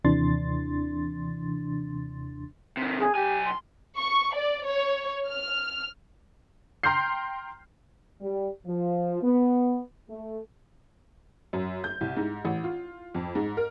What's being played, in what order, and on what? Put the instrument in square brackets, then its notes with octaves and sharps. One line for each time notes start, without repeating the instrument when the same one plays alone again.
[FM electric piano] D#2 C3 E3 D4 C6 A6
[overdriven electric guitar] C3 D#3
[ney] G#4
[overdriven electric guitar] B1 G#5 [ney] G4
[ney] C6
[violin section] C#6
D5
C#5
F6
[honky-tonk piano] G5 A#5 C6 F6 G6 C7
[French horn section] G3
F3
B3
A3
[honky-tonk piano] F#2
G6
C2
G#2
A1
F4
F2
G#2
A#4